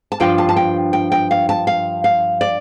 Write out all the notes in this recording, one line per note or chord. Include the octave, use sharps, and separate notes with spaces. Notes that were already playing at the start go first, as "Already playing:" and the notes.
A5
G2 F3 D4 F4 G5
A5
A5
G5
G5
G5
F5
A5
F5
F5
D5